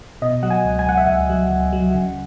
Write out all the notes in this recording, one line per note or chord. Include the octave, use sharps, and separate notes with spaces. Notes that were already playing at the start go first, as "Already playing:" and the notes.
B2 D#5
F#3 F#5
G#5
C#2
G#5
C#2 F#5
E5
C#2 F#5
F#3
C#2
F#3
C#3